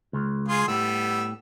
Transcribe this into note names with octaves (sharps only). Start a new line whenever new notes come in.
C#2
F4 G#4 C6
A2 G3 B3 E6